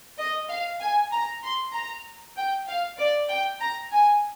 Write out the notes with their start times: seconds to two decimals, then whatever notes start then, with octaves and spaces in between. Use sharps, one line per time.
0.18 D#5
0.49 F5
0.80 G#5
1.12 A#5
1.43 C6
1.73 A#5
2.37 G5
2.67 F5
2.98 D5
3.29 G5
3.60 A#5
3.92 G#5